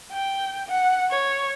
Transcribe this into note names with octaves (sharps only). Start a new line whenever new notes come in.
G5
F#5
C#5